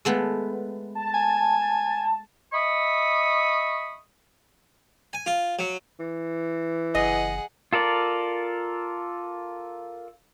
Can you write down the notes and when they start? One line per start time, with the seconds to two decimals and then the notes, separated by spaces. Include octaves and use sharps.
0.05 G#3 A3 B3
0.95 A5
1.14 G#5
2.53 D#5 E5 B5 C#6 D#6
5.13 G#5
5.26 F4
5.59 F#3
5.99 E3
6.95 F#1 G#4 D#5 F#5
7.73 F4 A4 A#4 D5